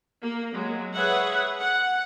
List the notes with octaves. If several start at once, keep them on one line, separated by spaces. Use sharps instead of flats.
A#3
F#3 G#3
G#4 B4 C#5 E5 F#5
F#5